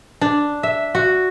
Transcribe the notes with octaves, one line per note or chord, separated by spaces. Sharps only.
D4
E5
F#4